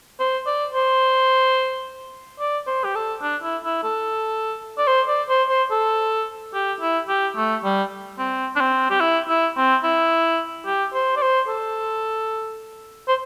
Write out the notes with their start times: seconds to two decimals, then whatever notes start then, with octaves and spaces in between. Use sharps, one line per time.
0.20 C5
0.47 D5
0.74 C5
2.40 D5
2.67 C5
2.85 G4
2.96 A4
3.22 D4
3.43 E4
3.64 E4
3.84 A4
4.78 D5
4.87 C5
5.08 D5
5.29 C5
5.49 C5
5.71 A4
6.54 G4
6.81 E4
7.09 G4
7.36 A3
7.64 G3
8.19 C4
8.56 D4
8.60 C4
8.91 G4
9.01 E4
9.29 E4
9.57 C4
9.84 E4
10.66 G4
10.93 C5
11.16 D5
11.22 C5
11.49 A4
13.08 C5